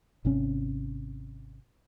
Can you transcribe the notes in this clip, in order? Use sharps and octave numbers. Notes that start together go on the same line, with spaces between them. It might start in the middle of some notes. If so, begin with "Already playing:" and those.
G#1 C3 C#4